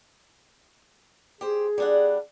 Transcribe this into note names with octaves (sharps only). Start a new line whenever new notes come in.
G4 G#4 C5
G3 D4 F#5